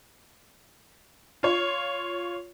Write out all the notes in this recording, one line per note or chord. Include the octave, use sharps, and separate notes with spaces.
F4 C#5